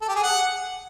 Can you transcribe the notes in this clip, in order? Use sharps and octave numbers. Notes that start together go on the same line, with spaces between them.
A4
G4
G#4
F#5